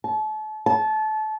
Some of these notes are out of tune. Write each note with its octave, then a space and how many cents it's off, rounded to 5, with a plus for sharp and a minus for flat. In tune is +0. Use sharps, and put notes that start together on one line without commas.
A5 -35
A5 -25